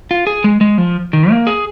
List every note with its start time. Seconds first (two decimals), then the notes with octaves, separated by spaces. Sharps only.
0.11 F4
0.27 G#4
0.44 G#3
0.61 G#3
0.78 F3
1.13 D#3
1.30 A#3
1.47 G#4